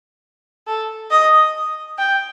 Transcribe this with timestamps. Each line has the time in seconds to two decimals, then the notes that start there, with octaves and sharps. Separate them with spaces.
0.67 A4
1.11 D#5
1.98 G5